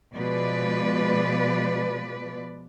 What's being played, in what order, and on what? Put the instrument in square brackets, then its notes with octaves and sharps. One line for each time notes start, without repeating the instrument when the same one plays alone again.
[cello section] B2 F3 G#3 B4 D5